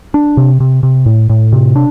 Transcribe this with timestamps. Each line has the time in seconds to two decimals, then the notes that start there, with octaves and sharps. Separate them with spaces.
0.14 D4
0.37 C3
0.60 C3
0.83 C3
1.06 A2
1.30 A2
1.53 C3
1.76 D4